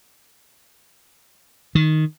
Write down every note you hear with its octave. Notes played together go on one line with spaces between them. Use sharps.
D#3